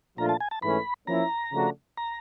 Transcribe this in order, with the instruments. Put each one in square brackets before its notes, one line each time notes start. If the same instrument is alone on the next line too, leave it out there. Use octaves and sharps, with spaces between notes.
[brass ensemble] A#2 F3 A3 D4 F4 [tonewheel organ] A#5
[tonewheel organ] A5
G#5
A5
[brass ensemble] G#2 E3 A3 C#4 [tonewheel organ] B5
[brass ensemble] F3 A#3 C#4 E4 [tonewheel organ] A#5
[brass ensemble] C#3 F3 A3 D4 F#4
[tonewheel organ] A#5